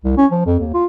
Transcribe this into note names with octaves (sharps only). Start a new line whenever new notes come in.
C2
C#4
F3
F2
D#2
F4